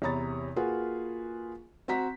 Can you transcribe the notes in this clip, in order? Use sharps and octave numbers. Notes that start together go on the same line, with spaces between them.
E2 C3 C#5 A#5 B5 A6
A#3 F4 F#4 G#4 B4
C4 F#4 A#5 B6